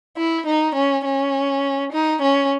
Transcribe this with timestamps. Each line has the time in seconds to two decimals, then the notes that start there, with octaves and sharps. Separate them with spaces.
0.17 E4
0.47 D#4
0.75 C#4
1.05 C#4
1.93 D#4
2.22 C#4